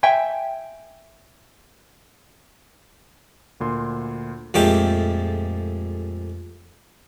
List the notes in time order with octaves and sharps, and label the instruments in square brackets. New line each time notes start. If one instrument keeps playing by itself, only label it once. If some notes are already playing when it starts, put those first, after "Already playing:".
[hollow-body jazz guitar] E5 G5 G#5
[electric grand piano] D2 A#2 C6
[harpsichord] F2 A#2 G#3 A3 G4 D6